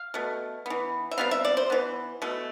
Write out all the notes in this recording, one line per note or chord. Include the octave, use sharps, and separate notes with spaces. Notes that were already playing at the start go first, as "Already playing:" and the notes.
Already playing: F5
B2 A3
E3 B3
E5
C3 G3 B3 F5
E5
D5
C5
E3 B3
B2 A3